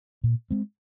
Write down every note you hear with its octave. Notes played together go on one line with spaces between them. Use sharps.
A#2
G#3 C4